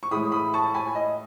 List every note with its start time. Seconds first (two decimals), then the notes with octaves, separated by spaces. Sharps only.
0.03 C#6
0.11 A2 E3 G#3 B5 D#6
0.32 B5 D#6
0.54 A5 C#6
0.74 G#5 B5
0.95 D#5